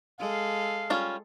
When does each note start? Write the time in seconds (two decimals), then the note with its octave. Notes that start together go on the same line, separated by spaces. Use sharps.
0.19 G#3 A4 F5
0.90 G3 C#4 F4